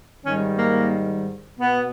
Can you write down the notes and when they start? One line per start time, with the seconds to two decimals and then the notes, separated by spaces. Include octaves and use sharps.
0.24 G#2 D#3 G3 C#4
0.58 A#3
1.60 B2 B3